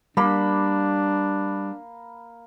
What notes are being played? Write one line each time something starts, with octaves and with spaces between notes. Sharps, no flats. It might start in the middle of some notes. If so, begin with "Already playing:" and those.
G3 A#3 D4 B5